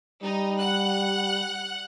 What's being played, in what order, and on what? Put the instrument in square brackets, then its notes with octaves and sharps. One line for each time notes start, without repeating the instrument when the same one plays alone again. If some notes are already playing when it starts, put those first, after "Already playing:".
[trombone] G3 [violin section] D#4
[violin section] F#5 F#6